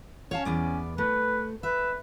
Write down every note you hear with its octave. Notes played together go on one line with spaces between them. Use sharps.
C#4 C#5 F5 A5
E2 B3 D5
A3 B4
B4 E5